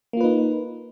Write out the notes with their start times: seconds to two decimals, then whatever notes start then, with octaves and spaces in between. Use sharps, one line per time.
0.13 A#3
0.17 F4
0.21 B4
0.24 D#4